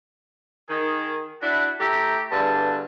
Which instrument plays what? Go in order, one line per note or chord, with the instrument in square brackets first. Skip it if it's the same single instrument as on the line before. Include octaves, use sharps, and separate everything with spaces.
[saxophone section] D#3 [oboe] G#4
[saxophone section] D4 E4 [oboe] F#4
[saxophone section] A3 E4 G4 [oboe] A#5
[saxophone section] E2 G2 D3 [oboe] A5